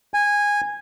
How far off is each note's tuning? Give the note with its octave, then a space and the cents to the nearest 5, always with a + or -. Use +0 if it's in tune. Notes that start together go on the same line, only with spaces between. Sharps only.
G#5 -15